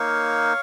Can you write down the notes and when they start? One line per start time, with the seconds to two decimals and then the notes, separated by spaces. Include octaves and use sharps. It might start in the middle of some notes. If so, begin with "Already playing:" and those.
Already playing: A#3 D#4 C#5 F5